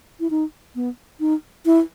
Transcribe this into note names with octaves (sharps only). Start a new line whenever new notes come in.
E4
D#4
B3
D#4
E4